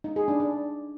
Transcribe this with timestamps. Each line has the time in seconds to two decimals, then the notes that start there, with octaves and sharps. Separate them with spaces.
0.04 D#4
0.16 G#4
0.28 D4
0.40 D4